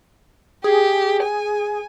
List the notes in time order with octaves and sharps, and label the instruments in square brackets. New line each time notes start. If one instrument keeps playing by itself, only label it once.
[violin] G4 [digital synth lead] G#4
[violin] G#5